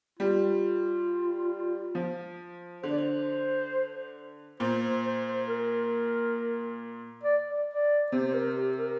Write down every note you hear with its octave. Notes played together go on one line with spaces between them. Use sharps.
G3 F4
F3
D3 C5
D5
C5
A#2 C5
C5
C5
C5
A#4
D5
D5
D5
C3 C5
C5
A#4
G4
A#4